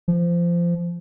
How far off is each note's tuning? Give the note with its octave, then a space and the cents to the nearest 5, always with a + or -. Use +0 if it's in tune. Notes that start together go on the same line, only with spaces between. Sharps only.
F3 -20